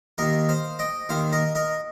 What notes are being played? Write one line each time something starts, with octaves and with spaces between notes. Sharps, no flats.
D#2 D#3 A#4 D#5
C5 F5
D#5 G5
D#2 D#3 C5 F5
A#4 D#5
A#4 D#5